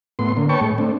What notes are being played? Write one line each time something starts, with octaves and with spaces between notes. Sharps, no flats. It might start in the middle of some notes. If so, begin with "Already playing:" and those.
A2 B3 C6
D3 A#3
B4 C#5 G5 A5 C#6
A2 G#3
A3 C4 D4